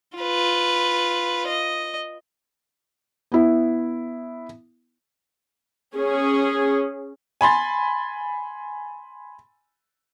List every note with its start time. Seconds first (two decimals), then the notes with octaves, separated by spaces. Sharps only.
0.18 F4 B4
1.48 D#5
3.32 B3 E4
5.95 C#4 G#4
7.41 G#5 B5 C6 A6